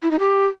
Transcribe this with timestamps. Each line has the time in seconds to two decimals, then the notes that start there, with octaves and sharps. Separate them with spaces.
0.03 E4
0.11 D#4
0.20 G4